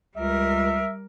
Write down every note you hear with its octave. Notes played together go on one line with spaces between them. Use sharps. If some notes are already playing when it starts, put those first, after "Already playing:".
C#2 G3 A#4 E5